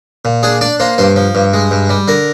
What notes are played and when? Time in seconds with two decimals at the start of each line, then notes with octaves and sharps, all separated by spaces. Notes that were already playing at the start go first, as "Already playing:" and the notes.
0.25 A#2
0.43 D4 G#4
0.61 D4 D5
0.80 A#3 C5
0.98 G2 C5
1.16 F3
1.35 G2
1.53 G#3
1.71 G2
1.89 G3
2.08 D3 A#4